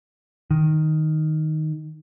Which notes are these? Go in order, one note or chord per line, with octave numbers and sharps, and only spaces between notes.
D#3